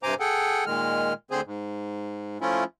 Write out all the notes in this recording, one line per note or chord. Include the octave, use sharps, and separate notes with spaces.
G2 C3 C5 G#5 A#5 D6
G#4 A4 F#5 G5
A#2 D#3 G#3 F6
D2 D3 C4 G#4 C5
G#2
F3 A3 C#4 E4 F4